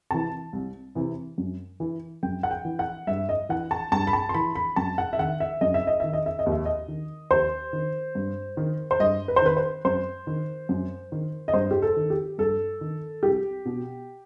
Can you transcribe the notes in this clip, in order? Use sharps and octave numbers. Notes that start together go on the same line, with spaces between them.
C3 E3 A5
C2
C3 E3
F#2
E3
F#2 G5
F#5
G5
E3
F#5
G2 E5
D#5
E3 F#5
A5
G2 A5
B5
A5
C6
E3 B5
B5
F#2 A5
F#5
E5
D#3 F#5
E5
F#2 D#5
E5
D#5
D#3 E5
D#5
E5
D#5
D#2
E5
D#5
D#3
D#2 C5
D#3
G2
D#3
C5
G2 D#5
B4
C5
D#3 B4
C5
F#2 C5
D#3
F#2
D#3
D#5
G2 C5
G4
A4
D#3
G4
G2 A4
D#3
C2 G4
B2